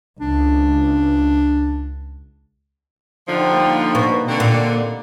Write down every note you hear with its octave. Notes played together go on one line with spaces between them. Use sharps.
C#2 D4
D3 F3 D#4 G4
G3 A#3
B2
D3 C4
A#2